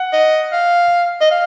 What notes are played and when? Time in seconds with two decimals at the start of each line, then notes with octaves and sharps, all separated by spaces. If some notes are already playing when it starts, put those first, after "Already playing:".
Already playing: F#5
0.13 D#5
0.52 F5
1.21 D#5
1.31 F5